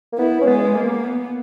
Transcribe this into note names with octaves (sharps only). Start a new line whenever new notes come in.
A#3
B3 E4
C#4
G#3 B3
A#3
B3